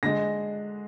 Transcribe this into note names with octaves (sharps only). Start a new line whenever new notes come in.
D3 G#3 A#6